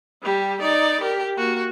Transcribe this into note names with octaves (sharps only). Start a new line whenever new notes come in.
G3 G4
D#4 D5
G4 A#4
A#3 F#4